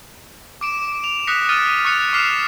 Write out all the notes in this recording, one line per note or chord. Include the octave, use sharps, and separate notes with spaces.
D6 D7 E7
F7
D#6 F#6 A#6 B6 C#7
D#6 F6 A6 D#7 E7
C#6 F#6 C#7 F7
D6 F6 C7 E7 F7